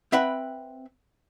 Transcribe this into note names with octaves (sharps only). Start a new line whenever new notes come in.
C4 B4 E5 F#5 G5 B5